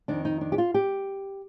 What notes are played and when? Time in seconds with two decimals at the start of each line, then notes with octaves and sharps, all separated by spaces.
0.08 F2 D#3 D4
0.25 D#4
0.41 D4
0.52 G4
0.58 F4
0.74 G4